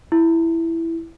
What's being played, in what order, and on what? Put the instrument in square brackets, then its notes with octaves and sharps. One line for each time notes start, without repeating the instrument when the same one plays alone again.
[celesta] E4